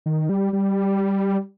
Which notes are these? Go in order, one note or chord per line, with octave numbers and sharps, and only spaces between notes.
D#3
G3
G3